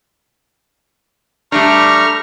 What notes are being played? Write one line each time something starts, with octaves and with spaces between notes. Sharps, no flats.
G3 A3 D4 A#5 C#6 F6